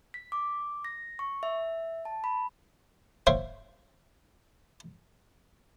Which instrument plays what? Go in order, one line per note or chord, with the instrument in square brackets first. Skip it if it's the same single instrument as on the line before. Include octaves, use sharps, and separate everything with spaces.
[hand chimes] B6
D6
A#6
C#6
E5
A5
B5
[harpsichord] C5 C#5 E5 F5 G5 C6